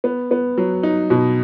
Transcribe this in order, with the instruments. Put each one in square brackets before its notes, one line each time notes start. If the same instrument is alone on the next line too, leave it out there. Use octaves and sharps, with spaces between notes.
[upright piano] B3
B3
F#3
D#4
B2